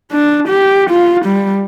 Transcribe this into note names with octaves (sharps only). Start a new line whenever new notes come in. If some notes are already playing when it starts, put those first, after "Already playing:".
D4
G4
F4
G3